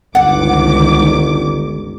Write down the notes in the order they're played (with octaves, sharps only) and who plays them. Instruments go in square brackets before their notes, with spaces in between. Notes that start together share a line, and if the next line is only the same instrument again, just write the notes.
[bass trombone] G1 [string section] C#2 D#3 D6 [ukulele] F#5